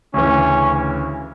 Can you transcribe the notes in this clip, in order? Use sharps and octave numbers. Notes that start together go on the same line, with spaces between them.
D2 C#3 E3 C#4